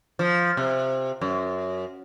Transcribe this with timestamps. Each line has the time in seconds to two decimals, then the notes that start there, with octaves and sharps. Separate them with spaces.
0.19 F3
0.57 C3
1.21 F#2